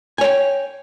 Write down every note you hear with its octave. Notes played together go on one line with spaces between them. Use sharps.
C#5 G5 G#5